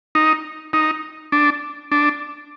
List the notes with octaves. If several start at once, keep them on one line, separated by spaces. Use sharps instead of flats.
D#4
D#4
D4
D4